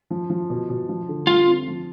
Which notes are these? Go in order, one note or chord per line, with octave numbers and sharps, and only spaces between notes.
F3
F3
B2
B2
F3
D3
G3 F4
C4
F3